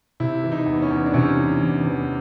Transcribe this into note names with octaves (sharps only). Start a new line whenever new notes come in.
C3 E4
E3
D#4
E2
C#4
E2
D4
C3 C#4
E3
E2
E2